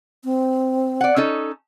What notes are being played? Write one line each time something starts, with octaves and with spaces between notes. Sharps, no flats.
C4
D5 F#5
C#4 D#4 A4